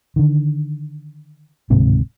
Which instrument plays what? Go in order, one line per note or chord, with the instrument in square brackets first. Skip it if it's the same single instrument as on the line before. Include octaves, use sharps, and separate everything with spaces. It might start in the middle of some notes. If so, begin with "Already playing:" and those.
[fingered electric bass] D3 D#3
D1 G#2 C3 D#3